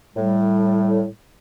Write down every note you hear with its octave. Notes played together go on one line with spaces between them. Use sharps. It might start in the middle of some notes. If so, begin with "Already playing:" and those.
A2 G3